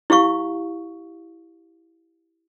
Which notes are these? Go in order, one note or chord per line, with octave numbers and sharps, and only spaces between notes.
E4 G4 F5 C#6